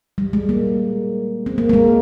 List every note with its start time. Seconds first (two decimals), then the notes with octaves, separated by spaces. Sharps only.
0.18 G3
0.33 G#3
0.49 A#3
1.46 C4
1.58 A#3
1.69 A#3
1.73 G#3